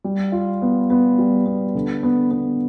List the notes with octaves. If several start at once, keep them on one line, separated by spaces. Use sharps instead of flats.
G3
F4
B3
B3
G3
B3
D3
B3
B3